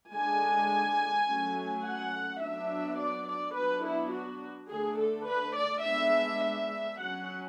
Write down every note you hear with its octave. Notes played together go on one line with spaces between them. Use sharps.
D3 G#3 D4 G#5
F#3 A3 C#4
F#5
F#3 B3 D4 E5
D5
D5
F#3 B3 D4 B4
E4
F#4
D3 A3 D4 G#4
A4
B4
D5
G#3 B3 D4 E5
E5
F#3 C#4 F#5